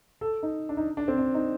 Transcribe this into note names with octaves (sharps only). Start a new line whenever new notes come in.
A4
D#4
D4
D#4
D4
C4
D4
D#4